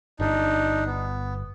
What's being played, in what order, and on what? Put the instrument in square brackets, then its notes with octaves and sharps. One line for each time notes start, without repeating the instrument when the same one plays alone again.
[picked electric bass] G1 [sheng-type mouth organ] D4 D#4
[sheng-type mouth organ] B3